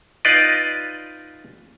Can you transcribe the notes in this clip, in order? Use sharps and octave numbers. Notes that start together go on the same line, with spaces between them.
D#4 F4 B4 D5 D#5